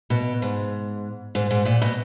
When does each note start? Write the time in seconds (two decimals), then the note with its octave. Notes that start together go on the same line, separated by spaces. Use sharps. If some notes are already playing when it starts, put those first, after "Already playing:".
0.10 B2
0.42 G#2
1.35 G#2
1.51 G#2
1.65 A#2
1.82 B2